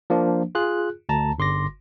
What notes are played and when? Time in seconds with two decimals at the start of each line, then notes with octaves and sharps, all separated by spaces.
0.10 F3 A#3 D4
0.55 F4 G#4 F#6
1.09 D2 A5 A#5
1.38 G1 C6 D6 A#6